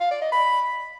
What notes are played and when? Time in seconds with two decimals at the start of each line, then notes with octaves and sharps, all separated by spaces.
0.01 F5
0.11 D5
0.21 D#5
0.32 B5